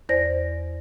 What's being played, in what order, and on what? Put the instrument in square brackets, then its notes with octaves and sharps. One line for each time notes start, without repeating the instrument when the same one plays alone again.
[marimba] E2 C5 D5 A#6